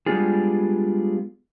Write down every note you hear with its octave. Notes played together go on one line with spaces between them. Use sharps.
G3 G#3 B3 D4 F4 G#4